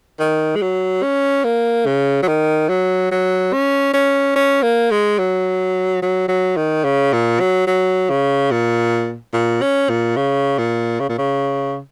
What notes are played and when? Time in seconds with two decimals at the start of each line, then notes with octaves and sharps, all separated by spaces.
0.20 D#3
0.56 G#3
0.62 F#3
1.03 C#4
1.44 A#3
1.87 C#3
2.23 F#3
2.28 D#3
2.69 F#3
3.12 F#3
3.53 C#4
3.94 C#4
4.36 C#4
4.63 A#3
4.91 G#3
5.19 F#3
6.02 F#3
6.29 F#3
6.57 D#3
6.85 C#3
7.13 A#2
7.40 F#3
7.67 F#3
8.10 C#3
8.51 A#2
9.34 A#2
9.62 C#4
9.90 A#2
10.17 C#3
10.58 A#2
11.00 C#3
11.09 A#2
11.18 C#3